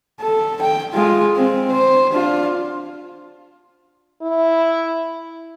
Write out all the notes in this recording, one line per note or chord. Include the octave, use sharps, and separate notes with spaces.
A4
G5
G#3 F4
C4
C5
D4 F4
E4